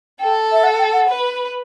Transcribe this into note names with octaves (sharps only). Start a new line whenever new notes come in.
A4 G5
E5
F#5
G5
F#5
B4